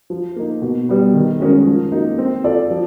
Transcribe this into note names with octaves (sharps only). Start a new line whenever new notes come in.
F3
A#3 D#4
B2
G3 B3
D#3
G#3 C#4 F#4 A#4
F3
A#3 D#4 F#4
C4
F4 A4 D5
F3